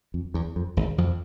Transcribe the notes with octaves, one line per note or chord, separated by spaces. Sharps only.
F2
E2
F2
G#1 G#2
F2 F3